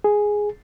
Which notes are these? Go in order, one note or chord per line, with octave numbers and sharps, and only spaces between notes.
G#4